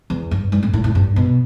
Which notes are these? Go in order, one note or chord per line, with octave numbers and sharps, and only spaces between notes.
E2
G2
G2
A2
A2
A2
G2
B2